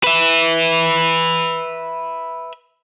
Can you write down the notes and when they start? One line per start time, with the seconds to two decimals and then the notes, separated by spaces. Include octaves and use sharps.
0.04 B4 E5